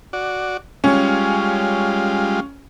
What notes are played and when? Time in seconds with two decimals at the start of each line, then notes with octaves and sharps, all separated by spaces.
0.13 F#4 D5
0.84 G3 G#3 C#4 F4